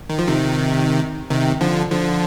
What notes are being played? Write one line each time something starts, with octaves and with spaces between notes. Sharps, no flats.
D#3
F3
C3 D#3
C3 D#3
D3 F3
D3 F3